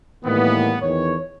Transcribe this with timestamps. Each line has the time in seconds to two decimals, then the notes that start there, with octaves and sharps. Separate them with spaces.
0.24 A2 D#3 E3 G3 A#3 B3
0.82 E2 D#3 C#5